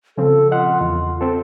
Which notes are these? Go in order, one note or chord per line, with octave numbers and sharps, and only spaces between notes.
C#3 F3 C4 A4
F4 D#5 F#5
E2
C4 A4